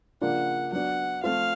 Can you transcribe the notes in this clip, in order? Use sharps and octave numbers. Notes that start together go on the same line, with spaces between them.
C#3 F3 A#3 D4 F4 F#5
F#3 B3 D4 F#5
F3 A3 C4 F4 F5